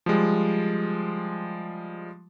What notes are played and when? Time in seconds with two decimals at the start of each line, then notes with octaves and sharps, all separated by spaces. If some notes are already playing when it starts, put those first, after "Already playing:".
0.06 F3 G3 G#3